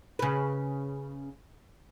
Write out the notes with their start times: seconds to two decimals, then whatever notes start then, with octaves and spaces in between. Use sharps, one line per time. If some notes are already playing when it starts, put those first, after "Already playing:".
0.19 C#3 B4